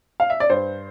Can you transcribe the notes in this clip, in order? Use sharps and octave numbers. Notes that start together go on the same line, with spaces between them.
F5
E5
D5
G2 C5